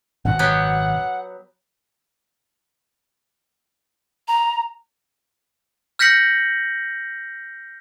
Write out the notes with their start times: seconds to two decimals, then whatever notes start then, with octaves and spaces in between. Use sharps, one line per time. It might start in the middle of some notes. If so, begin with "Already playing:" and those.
0.25 G#1 F#2 B2 F#5
0.39 F#3 B3 G4
4.28 A#5
5.99 F6 G6 A#6 B6 C#7 F#7